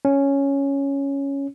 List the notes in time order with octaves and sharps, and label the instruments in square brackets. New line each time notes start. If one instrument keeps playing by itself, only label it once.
[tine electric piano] C#4